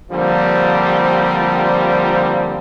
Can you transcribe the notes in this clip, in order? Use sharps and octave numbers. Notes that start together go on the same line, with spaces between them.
D3 F3 G3 A#3 C4